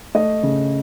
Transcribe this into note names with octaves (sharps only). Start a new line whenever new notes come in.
A3 D#5
C#3